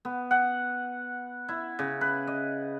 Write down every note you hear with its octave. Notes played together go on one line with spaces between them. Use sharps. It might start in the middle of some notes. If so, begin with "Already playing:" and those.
B3
F#5
E4
C#3
B4
D#5